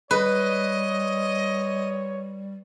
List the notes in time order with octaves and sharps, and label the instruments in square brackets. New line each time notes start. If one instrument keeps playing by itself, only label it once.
[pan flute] G3 [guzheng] B4 [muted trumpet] C#5 [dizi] D#5